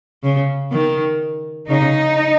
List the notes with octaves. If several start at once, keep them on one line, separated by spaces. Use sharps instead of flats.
C#3
D#3
C#3 D#4